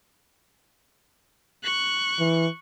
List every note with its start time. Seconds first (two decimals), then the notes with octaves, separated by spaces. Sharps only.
1.64 C#6 F#6
2.20 E3